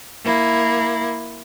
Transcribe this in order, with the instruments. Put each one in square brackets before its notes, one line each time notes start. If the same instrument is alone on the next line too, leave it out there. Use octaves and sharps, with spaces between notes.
[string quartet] A#3 E4